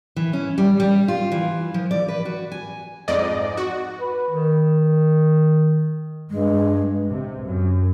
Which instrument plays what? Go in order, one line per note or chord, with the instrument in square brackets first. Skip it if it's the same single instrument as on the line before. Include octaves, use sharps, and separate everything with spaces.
[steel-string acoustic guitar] E3
C#4
G3
G3
F4
E3
F3
D5
B4
F#4
G#5
[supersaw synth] F2 G#2 D5 D#5
F#4
[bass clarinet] B4
D#3
[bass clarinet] G2 [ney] G#3
[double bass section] C3
F#2